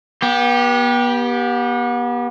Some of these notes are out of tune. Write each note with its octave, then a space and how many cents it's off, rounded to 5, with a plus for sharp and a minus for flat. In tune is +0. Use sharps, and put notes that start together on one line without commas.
B3 -35 G4 +0